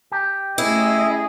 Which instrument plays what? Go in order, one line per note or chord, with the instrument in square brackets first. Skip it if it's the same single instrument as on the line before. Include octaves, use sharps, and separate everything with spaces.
[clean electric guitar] G4
[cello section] A3 C#4 D#5 [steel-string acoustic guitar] E4 [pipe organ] G#4